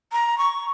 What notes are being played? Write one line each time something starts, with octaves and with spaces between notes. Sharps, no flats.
A#5
C#6